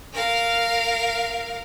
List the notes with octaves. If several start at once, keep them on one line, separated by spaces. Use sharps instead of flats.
A#4 F5